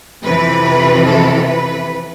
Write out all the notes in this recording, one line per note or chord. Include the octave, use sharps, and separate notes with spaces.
F2 C3 E3 B4
A4
B4